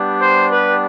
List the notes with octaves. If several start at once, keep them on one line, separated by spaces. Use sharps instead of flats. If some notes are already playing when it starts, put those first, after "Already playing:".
Already playing: G3 B3 D4 G4
C5
B4